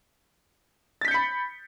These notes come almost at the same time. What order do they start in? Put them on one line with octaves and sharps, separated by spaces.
A6 B6 G6 C#7 B5